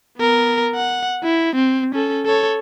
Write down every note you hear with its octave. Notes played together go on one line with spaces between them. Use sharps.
B3 A#4
F#5
E4
C4
C#4 A4
A4 C#5